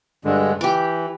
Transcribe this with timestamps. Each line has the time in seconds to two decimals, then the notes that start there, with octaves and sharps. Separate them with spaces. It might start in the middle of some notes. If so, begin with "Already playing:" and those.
0.25 G2 D3 G#3
0.61 E3 G4 D6